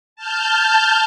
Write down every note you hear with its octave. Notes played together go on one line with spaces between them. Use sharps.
A5 F6 G6